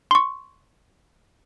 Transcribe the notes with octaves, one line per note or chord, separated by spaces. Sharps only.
C6 C#6